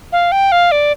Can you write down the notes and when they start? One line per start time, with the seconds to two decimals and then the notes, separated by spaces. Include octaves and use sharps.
0.12 F5
0.32 G5
0.52 F5
0.71 D5